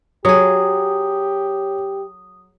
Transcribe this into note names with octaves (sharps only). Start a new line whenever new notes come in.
F#3 G4 G#4 C#5 D#6